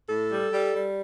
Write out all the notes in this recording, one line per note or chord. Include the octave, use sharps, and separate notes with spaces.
A2 A4
G3
G3
G3